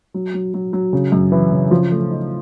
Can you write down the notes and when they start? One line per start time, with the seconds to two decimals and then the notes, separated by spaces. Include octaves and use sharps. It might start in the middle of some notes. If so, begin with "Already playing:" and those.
0.14 F#3
0.34 F#3
0.54 F#3
0.73 F#3
0.93 C#3
1.12 F#2
1.32 E3
1.52 C#3
1.71 F3
1.91 A3
2.11 D#4